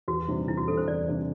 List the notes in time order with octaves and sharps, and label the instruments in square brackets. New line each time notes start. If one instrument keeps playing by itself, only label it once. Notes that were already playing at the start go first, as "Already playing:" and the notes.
[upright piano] E2 [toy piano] F#4
[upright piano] C3 G3 D4
[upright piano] E2 [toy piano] E4
[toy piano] F#4
[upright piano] C3 G3 D4 [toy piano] A4
[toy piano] C5
[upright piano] E2 [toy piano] D5
[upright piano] C3 G3 D4